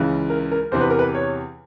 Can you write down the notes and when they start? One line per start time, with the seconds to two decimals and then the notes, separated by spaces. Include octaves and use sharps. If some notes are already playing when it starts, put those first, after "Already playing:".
Already playing: C#2 C#3 E3
0.30 A#4
0.51 A#4
0.72 E2 C3 E3 C5
0.81 B4
0.90 A#4
0.99 B4
1.15 C#5